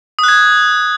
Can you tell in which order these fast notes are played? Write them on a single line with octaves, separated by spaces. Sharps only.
D#6 F#6 G#6